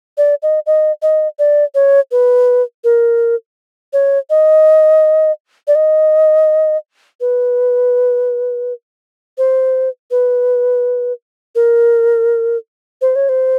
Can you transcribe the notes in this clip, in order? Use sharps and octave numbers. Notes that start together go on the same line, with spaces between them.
D5
D#5
D#5
D#5
D5
C#5
B4
A#4
C#5
D#5
D5
D#5
B4
C5
B4
A#4
C5
C#5
C5